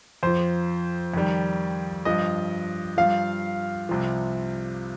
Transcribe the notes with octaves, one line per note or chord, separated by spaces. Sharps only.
F2 F3 C5
F2 D#3 G3
G2 F3 D#5
G2 F3 F5
C2 C3 F3